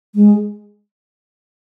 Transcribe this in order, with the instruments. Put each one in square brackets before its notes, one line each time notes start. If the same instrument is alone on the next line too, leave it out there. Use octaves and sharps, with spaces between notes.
[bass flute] G#3